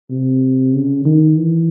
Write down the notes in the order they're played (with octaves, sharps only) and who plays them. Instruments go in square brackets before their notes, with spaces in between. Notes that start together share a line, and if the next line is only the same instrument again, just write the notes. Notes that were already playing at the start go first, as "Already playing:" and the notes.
[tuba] C3
C#3
D#3
E3